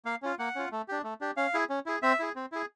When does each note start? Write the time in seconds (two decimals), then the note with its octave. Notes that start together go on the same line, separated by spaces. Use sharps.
0.05 A#3 F5
0.22 C#4 F4
0.39 A#3 F#5
0.55 C#4 F4
0.72 A3
0.88 D4 G4
1.04 A3
1.21 D4 G4
1.37 C#4 F5
1.54 E4 G#4
1.69 C#4
1.86 E4 G#4
2.03 C4 E5
2.19 E4 G#4
2.36 C4
2.52 E4 G#4